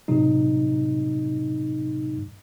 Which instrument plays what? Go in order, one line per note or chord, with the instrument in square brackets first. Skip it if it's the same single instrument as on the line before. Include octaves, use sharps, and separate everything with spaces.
[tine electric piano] A2 C3 F#3 D#4